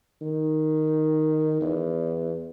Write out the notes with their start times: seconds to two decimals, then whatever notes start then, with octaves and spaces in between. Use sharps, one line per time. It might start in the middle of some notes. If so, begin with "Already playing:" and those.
0.21 D#3
1.61 E2